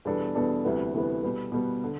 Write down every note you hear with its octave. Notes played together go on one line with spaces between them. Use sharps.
E2 B2 G3 D4 A4
E2 B2 G3 D4 A4
D2 C3 E3 G3 B3
D2 C3 E3 G3 B3
B2 G3 B3
B2 G3 B3
D3